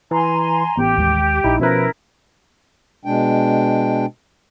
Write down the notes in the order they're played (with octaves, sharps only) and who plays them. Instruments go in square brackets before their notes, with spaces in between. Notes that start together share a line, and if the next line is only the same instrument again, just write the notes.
[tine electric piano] E3 [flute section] G#5 A#5 C6
[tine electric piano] A1 [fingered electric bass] B3 [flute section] G4
[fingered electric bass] D#2 G#3
[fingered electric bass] A#1 [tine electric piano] D#4 E4
[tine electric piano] B2 F3 B4 [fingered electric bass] C#4 [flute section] E4 A#4
[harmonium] B2 G#3 D4 G5